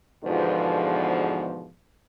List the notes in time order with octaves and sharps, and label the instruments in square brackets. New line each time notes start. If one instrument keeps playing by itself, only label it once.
[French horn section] E2 G#2 B2 D3 F3